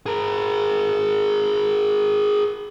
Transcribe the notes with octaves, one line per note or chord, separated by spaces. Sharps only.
G#4 A#4